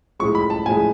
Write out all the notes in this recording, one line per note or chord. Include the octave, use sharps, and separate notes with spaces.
A2 F3 G#3 C#6
B5
A5
A2 F3 G#3 G#5